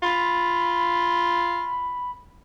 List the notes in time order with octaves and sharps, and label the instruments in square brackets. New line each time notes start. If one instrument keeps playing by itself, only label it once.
[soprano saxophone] F4 [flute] B5